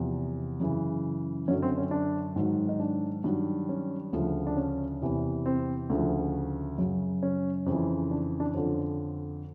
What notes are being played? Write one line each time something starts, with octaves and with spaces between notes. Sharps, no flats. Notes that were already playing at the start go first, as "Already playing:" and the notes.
Already playing: E2 C3 F3
F#2 C#3 E3
F#2 D3 F#3 C#4
C4
C#4
D4
G#2 D#3 F#3
D#4
D4
G2 D#3 F#3
C#4
D2 C#3 F3
D4
C#4
E2 C3 E3
C4
D2 C#3 F3
F#2 C#3 F#3
C#4
F2 C#3 E3
D4
D4
F2 D3 F3 C#4